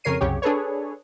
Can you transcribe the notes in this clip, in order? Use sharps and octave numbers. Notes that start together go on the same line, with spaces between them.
F2 C#3 A#4 C#5 C7 D#7
C2 F#2 C#3 F#3 G4 C#5
D4 G#4 A4 B4 C#5